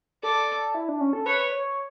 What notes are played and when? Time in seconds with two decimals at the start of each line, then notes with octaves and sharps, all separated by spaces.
0.23 A4 D5
0.75 E4
0.89 D4
1.01 C#4
1.13 A4
1.26 B4 C#5
1.52 C#5